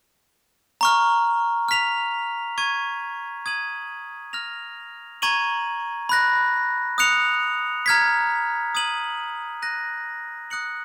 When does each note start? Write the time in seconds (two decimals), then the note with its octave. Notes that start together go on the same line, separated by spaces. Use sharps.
0.81 A#5 C#6 F6
1.68 F6 B6 F7
2.58 C#6 G#6 D#7
3.46 D#6 G#6 D#7 F#7
4.33 F6 A#6 F7
5.22 A#5 C#6 G#6 D#7 F#7
6.09 B5 F#6 A#6
6.98 D#6 F#6 C#7 F7
7.86 A#5 F6 G#6 B6
8.75 D#6 G#6 D#7 F#7
9.62 F#6 A#6 D#7
10.50 D#6 F#6 C#7 F#7